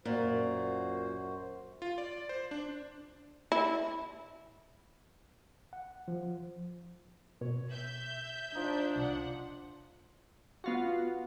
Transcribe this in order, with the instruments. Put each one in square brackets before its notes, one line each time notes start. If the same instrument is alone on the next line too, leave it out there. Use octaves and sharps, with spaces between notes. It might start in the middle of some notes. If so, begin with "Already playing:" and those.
[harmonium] F#2 F#4 C5 [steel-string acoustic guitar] A#2
[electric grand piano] F4
D5
C5
D4
[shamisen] E4
[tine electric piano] F#5
F3
[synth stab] B2 [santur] C#5
[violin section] E5 G6
[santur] F3 D#4 [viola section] D4
[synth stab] C2 [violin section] F#5
[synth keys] B3 F4 F#4